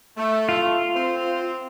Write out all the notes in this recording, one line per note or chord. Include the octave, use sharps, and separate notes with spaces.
A3
F4
C4 C5